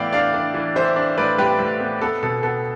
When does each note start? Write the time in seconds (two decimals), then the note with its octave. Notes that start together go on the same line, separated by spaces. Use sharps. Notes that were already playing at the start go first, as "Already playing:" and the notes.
Already playing: A2 E3 B3 D5 E5 F5 G5
0.12 D4 D5 F5
0.34 D4
0.54 E3
0.76 E3 C5 E5
0.96 D4
1.18 A2 B4 D5
1.38 A2 G4 B4
1.59 A2
1.80 B3
2.02 B3 A4
2.23 B2 A4
2.43 B3 A4